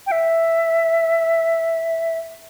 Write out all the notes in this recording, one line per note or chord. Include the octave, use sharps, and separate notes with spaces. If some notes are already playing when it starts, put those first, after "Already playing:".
G5
E5